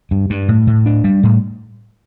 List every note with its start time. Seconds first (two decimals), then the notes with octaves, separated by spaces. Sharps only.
0.11 G2
0.30 G2
0.48 A2
0.67 A2
0.86 D4
1.04 G3
1.23 A2